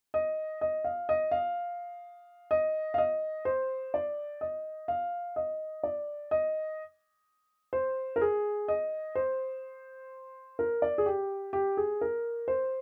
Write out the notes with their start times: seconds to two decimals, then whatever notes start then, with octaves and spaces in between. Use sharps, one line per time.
0.14 D#5
0.61 D#5
0.84 F5
1.09 D#5
1.31 F5
2.51 D#5
2.94 F5
2.98 D#5
3.45 C5
3.94 D5
4.41 D#5
4.88 F5
5.36 D#5
5.83 D5
6.31 D#5
7.73 C5
8.16 A#4
8.21 G#4
8.68 D#5
9.15 C5
10.59 A#4
10.82 D5
10.98 G#4
11.06 G4
11.53 G4
11.77 G#4
12.01 A#4
12.48 C5